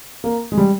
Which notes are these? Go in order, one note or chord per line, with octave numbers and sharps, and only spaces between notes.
A#3
G#3
G3